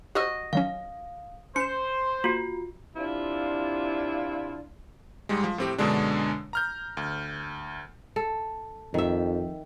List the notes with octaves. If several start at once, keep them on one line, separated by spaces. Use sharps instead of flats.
F#4 G4 C5 D#5 E6
D#3 F#3 C#4 F5
C#4 C5 C#7 E7
A#3 F4 F#4
C3 D4 E4 F4
G#2 G3 G#3
F3
A2 C4 G4
F#2 B2 D3 G#3 D4
A#5 F6 G6
D2
A4
F2 D#3 E5